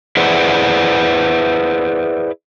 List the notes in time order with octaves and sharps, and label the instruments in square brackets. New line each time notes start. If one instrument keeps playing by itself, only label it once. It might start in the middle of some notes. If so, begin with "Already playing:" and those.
[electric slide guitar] E4 G#4 B4 C5 D5 F#5